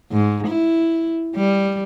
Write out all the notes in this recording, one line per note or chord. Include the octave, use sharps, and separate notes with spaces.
G#2
E4
G3